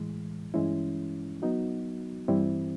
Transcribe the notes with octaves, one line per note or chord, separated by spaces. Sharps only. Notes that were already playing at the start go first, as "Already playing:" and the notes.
Already playing: A2 E3 G#3
G2 E3 G#3 C#4 E4
F#3 B3 D#4 F#4
G2 E3 G3 C4 E4